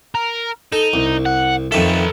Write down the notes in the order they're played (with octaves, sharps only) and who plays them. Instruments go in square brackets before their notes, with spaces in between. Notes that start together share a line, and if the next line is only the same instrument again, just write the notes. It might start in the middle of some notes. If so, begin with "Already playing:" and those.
[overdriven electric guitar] A#4
[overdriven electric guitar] D#4 [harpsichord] A4
[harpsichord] C2
[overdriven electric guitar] F#5
[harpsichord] F2 D#3 E5 [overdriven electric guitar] A4 B4